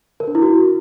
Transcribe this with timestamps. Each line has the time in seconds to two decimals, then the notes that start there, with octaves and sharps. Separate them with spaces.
0.20 A#4
0.27 D4
0.35 E4
0.42 F#4